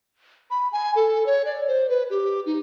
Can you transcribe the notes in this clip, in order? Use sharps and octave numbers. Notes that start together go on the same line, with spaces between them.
B5
G#5
A4
C#5
D5
C5
B4
G4
D#4